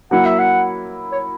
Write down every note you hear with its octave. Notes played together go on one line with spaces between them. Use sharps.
F#3 A#3 E4 F#5
E5
F#5
C#5